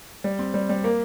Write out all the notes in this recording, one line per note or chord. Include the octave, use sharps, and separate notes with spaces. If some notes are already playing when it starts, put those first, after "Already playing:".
G3
C4
G3
G3
A#3